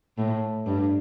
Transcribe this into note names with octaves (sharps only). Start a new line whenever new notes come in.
A2
G2